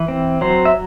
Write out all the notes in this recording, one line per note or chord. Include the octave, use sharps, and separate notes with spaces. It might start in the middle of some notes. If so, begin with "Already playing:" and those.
Already playing: E3
C4
F#3 C5
E5